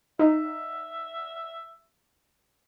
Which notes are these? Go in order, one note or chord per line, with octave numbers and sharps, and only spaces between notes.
D#4 E5